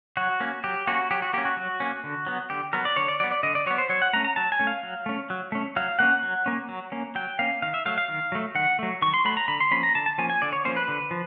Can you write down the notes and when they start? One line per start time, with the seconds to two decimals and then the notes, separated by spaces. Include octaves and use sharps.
0.17 F#3 F#4
0.40 A#3 C#4
0.64 F#3 G4
0.87 A#3 C#4 F#4
1.11 F#3 G4
1.22 F#4
1.33 A#3 C#4 G4
1.45 F#4
1.57 F#3
1.80 A#3 C#4
2.04 D3
2.27 F#3 B3
2.50 D3 G4
2.73 F#3 B3 A#4
2.85 D5
2.96 D3 C#5
3.08 D5
3.20 F#3 B3 D5
3.31 D5
3.43 D3 D#5
3.55 D5
3.66 F#3 B3 C#5
3.78 C5
3.89 F#3 C#5
4.02 F#5
4.13 A3 C#4 A#5
4.24 A#5
4.36 F#3 A5
4.52 G#5
4.59 A3 C#4
4.67 F5
4.83 F#3
5.06 A3 C#4
5.30 F#3
5.52 A3 C#4
5.76 F#3 F5
5.99 A#3 C#4 F#5
6.23 F#3
6.46 A#3 C#4
6.69 F#3
6.92 A#3 C#4
7.15 F#3 G5
7.39 A#3 C#4 F5
7.62 D#3 F5
7.74 E5
7.86 F#3 A3 F5
7.98 F5
8.09 D#3
8.32 F#3 A3
8.55 D#3 F#5
8.79 F#3 A3
9.02 D#3 C#6
9.14 C6
9.25 F#3 A3 B5
9.37 A#5
9.48 D3 B5
9.60 C6
9.71 F3 A#3 C#4 B5
9.83 A#5
9.95 D3 A5
10.06 A5
10.18 F3 A#3 C#4 G#5
10.30 G#5
10.42 D3 D5
10.53 C#5
10.65 F3 A#3 C#4 C5
10.77 B4
10.88 D3
11.11 F3